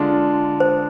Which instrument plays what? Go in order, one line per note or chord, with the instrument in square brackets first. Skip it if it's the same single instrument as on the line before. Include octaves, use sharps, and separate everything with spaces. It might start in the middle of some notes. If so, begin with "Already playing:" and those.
Already playing: [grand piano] D3 G#3 D4 F4
[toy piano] C5